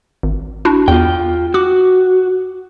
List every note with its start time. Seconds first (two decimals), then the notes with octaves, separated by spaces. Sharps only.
0.23 G#1
0.65 D4 E4 F#4
0.88 E2 F4 G5
1.54 F#4 D6